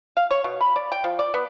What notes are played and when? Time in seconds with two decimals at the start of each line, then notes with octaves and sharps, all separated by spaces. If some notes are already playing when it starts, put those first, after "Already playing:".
0.17 F5
0.31 C#5
0.44 B2
0.61 B5
0.76 D5
0.92 G5
1.04 F3
1.19 D5
1.34 B3